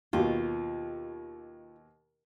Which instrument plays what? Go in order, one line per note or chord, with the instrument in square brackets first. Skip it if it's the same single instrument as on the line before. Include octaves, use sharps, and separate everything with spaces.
[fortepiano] D#2 B2 [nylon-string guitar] F4